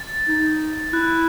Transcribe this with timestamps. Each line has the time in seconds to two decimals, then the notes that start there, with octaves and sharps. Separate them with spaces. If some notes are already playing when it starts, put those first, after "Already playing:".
Already playing: A6
0.28 D#4
0.93 E4 F#6